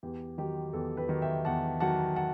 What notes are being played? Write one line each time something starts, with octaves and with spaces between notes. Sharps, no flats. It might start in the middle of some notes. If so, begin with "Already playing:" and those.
E2 G4
D#3 F#3 G4
E2 A4
G4 B4
D#3 F#3
E5 G5
E2 F#5 A5
D#3 F#3 F#5 A5
F#5 A5